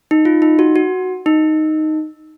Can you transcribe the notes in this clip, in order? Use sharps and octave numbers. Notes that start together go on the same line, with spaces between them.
D#4
F4
D#4
F#4
F#4
D#4